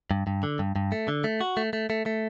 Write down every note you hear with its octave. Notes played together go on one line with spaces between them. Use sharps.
G2
G2
D3
G2
G2
A3
D3
A3
F#4
A3
A3
A3
A3